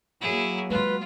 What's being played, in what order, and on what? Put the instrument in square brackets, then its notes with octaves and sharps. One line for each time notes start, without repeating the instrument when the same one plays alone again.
[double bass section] F#3 A#3 [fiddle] E4 G#4
[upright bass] G#3 D4 [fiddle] F4 [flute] B4